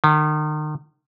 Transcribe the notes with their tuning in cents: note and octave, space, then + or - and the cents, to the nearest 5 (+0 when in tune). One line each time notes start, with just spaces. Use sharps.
D#3 -35